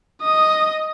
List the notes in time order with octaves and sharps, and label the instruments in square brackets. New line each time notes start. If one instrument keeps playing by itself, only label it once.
[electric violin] D#5 D#6